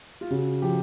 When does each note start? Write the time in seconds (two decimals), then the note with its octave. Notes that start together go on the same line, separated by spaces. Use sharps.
0.21 F4
0.30 C#3 F#4
0.62 F3 G4